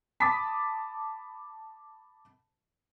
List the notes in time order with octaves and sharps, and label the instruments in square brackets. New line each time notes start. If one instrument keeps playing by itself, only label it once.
[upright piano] A5 B5 D6 D#6 A6 B6